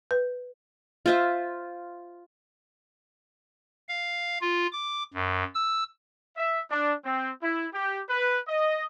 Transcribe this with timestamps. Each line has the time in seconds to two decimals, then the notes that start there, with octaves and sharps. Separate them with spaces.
0.11 B4
1.06 F4 C5 E5
3.89 F5
4.41 F4
4.72 D6
5.14 F#2
5.55 E6
6.37 E5
6.70 D4
7.04 C4
7.41 E4
7.73 G4
8.09 B4
8.48 D#5